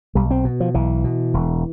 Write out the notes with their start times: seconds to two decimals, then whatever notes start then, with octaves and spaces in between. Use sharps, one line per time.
0.15 B1 G3
0.31 C4
0.45 B2
0.60 F3
0.74 B1 E3
1.04 B2
1.34 E1